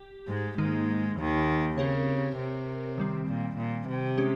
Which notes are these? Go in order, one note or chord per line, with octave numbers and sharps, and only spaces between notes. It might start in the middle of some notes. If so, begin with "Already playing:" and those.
Already playing: G4
G#2 G#3
G#2 D#3 G#3 A#3 D#4
D#2 D#3
C#3 C4 G4 A#4 C#5
C3
D#3 G3 C4
A#2
A#2
C3
G#3 C#4 G4